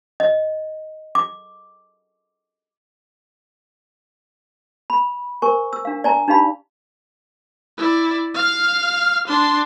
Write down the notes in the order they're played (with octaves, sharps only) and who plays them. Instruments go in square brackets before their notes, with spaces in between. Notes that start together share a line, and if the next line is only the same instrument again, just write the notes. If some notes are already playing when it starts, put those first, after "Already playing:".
[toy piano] D#5
D6
B5
A#4 C5 G#5 C#6
E6
D4 F5
D5 G#5 A#5
D4 D#4 G4 F5 B5
[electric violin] E4 D5
F5 F6
D4 C6